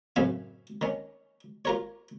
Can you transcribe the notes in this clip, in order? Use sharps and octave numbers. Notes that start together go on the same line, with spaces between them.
F#2 A2 C#3 C4 F5 G#5
D#3 C#4
F4 A#4 C#5